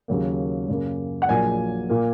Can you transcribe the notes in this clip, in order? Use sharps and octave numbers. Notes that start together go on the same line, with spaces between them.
D#2 C#3 F#3 A#3
F#2 C#3 A#3
F#5
A#1 A#2 F#3 A#3 G#5
A#2 A#3